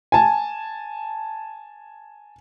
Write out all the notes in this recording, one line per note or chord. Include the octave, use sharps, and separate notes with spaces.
G#5 A5